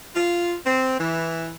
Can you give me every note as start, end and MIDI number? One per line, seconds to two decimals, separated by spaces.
0.15 0.55 65
0.65 0.95 60
0.99 1.53 52